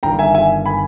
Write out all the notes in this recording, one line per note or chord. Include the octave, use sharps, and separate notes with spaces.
G1 G2 D#3 G5 A#5
E5 G#5
E5 G#5
G#5 B5